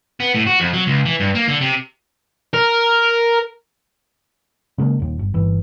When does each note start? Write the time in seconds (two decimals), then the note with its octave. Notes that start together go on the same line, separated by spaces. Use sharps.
0.20 B3
0.35 A2
0.47 F#4
0.60 F2
0.73 F#3
0.87 C#2
1.06 E3
1.20 G2
1.35 A#3
1.48 D3
1.61 C3
2.54 A#4
4.78 C#3 G#3 A#3
5.00 D#1 D#2
5.19 G1
5.34 G1 E3